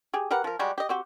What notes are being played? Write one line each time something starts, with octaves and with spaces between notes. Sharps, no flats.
G4 G#4
G4 A#4 B4 F#5
F3 A#4
G3 G#3 F#4 G4
G4 D#5
C4 F#4 G4